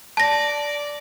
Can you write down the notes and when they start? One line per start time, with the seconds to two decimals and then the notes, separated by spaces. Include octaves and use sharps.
0.17 D5 A5 D6 A#6